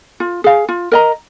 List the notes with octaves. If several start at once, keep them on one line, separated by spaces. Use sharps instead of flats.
F4
G#4 F5
F4
A#4 D#5 A#5